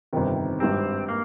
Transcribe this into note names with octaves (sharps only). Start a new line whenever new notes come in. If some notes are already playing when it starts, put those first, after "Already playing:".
G1 F2 C3 D#3
G#1 G2 G3 C4
A#3